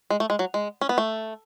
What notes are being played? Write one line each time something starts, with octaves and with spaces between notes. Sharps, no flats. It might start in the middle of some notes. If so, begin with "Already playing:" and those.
G#3
A3
G#3
F#3
G#3
C#4
B3
A3